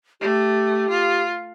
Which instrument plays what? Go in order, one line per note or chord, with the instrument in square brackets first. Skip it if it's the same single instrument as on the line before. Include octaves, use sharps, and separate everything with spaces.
[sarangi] A3 [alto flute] G4
[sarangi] F4